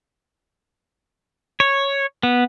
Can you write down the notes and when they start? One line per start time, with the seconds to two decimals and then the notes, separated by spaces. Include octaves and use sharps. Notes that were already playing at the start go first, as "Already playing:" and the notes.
1.60 C#5
2.23 B3